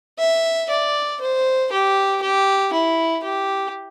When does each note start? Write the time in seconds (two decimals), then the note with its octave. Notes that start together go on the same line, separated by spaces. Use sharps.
0.19 E5
0.70 D5
1.21 C5
1.72 G4
2.22 G4
2.73 E4
3.24 G4